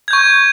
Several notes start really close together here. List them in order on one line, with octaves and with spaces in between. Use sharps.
G#6 G6 C#6